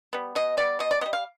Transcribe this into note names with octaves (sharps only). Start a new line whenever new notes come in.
G3 B3
B2 D#5
G3 B3 D5
B2 D#5
D5
G3 B3 D#5
F5